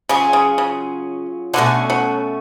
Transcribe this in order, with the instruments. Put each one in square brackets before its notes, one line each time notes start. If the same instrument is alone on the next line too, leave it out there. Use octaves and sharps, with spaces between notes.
[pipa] C#3 [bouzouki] F#3 C#4 F4 G#4
[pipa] C#3
C#3
[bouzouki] B2 A3 C#4 F#4 [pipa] D3
[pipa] F#3